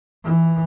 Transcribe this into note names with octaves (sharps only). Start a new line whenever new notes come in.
E3